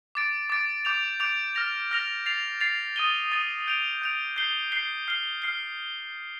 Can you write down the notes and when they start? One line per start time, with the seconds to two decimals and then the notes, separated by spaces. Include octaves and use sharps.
0.15 D6 A6 D7
0.50 D6 A6 D7
0.85 D6 G6 D7 F7
1.20 D6 G6 D7 F7
1.55 F6 A#6 F7
1.91 F6 A#6 F7
2.26 A6 C7 F7
2.61 A6 C7 F7
2.96 D#6 A6 D#7 G7
3.32 D#6 A6 D#7 G7
3.67 G6 D7 F7
4.02 G6 D7 F7
4.36 G6 C7 G7
4.72 G6 C7 G7
5.08 F6 C7 G7
5.42 F6 C7 G7